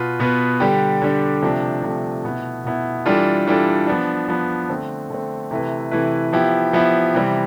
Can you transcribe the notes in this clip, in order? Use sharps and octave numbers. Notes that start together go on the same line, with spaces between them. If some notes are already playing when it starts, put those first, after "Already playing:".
Already playing: B2 B3 F4 B4
B2 B3 F4 B4
D3 G3 D4 G4
D3 G3 D4 G4
C3 F3 A3 D4
C3 F3 A3 D4
B2 B3 E4
B2 B3 E4
E3 G3 D4 F4 A4
E3 G3 D4 F4 A4
F3 B3 D4
F3 B3 D4
D3 A3 C4
D3 A3 C4
C3 E3 A3 E4 B4
C3 E3 A3 E4 B4
F3 B3 E4 G4
F3 B3 E4 G4
C3 E3 G3 C4 E4